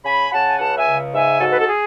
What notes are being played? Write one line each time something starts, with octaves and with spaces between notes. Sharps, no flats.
C#3 G#5 B5
C#3 F#5 A5
G#5
C#2 F#5 A5
E5 G#5
C#3
G#2 E5 G#5
G#2 F#4 A4
B4
A4
G#4